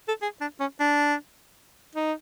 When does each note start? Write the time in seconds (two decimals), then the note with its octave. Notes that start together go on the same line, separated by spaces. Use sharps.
0.08 A4
0.22 G#4
0.41 D4
0.60 C#4
0.80 D4
1.95 D#4